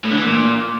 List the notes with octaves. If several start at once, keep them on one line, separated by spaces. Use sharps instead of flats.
A2
D3
E3
A#2